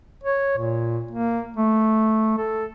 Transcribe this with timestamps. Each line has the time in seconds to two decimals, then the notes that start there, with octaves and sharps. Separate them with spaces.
0.23 C#5
0.57 A#2
1.11 A#3
1.57 A3
2.38 A4